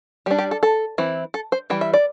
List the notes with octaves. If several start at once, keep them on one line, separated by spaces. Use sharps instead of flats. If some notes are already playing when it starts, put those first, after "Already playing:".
G3 D4 G4
G4
A4
A4
E3 C4 E4
A4
C5
E3 G3 E4 G5
E5
D5